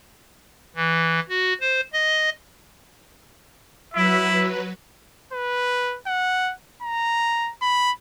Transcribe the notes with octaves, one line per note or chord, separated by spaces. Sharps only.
E3
F#4
C5
D#5
F#3 E4 B4 E5
B4
F#5
A#5
B5